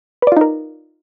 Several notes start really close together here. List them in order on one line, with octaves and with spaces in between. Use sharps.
B4 D5 F4 D#4 A#4